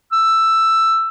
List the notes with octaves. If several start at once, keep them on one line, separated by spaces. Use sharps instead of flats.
E6